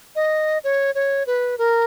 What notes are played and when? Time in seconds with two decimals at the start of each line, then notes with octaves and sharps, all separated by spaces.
0.16 D#5
0.64 C#5
0.95 C#5
1.27 B4
1.58 A#4